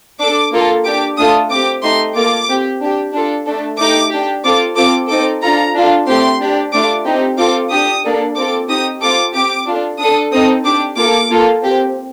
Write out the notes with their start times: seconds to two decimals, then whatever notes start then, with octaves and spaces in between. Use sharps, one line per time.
0.19 D4 A4 D6
0.52 A#3 F4 A4
0.85 D4 G4 D6
1.17 A3 D4 F4 A4 D#6
1.50 C4 G4 D6
1.82 A3 D#4 G4 C6
2.15 A#3 F4 A4 D6
2.48 C4 G4
2.81 D4 G4
3.13 D4 F4 A4
3.46 A3 D4 A4
3.78 A3 D#4 G4 D6
4.11 D4 G4
4.44 C4 F4 A4 D6
4.77 C4 F4 A4 D6
5.09 C4 D#4 A4 D6
5.41 D4 F4 A4 A#5
5.74 D4 F4 A4
6.07 A3 C4 G4 C6
6.40 D4 G4
6.73 A3 D4 F4 D6
7.05 C4 D#4 G4
7.37 C4 F4 A4 D6
7.70 D4 G4 D#6
8.03 A#3 D4 A4
8.36 C4 F4 A4 D6
8.68 C4 D#4 G4 D#6
9.01 C4 F4 A4 D6
9.33 C4 G4 D6
9.66 D4 F4 A4
9.99 D4 A4 D#6
10.32 C4 D#4 A4 D#6
10.64 D4 G4 D6
10.97 A#3 F4 A4 D6
11.30 A#3 F4 A4
11.62 C4 G4